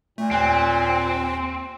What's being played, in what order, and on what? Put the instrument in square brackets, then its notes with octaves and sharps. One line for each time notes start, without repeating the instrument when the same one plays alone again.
[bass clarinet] A#2 [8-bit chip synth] A3
[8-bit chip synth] D#2 [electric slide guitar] C4 [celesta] G#5 F#6